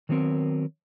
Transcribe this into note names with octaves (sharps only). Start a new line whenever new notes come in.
D#3 F#3 B3 C4 A#4